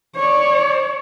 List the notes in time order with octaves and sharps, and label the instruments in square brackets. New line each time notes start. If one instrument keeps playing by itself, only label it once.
[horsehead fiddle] C#5 D5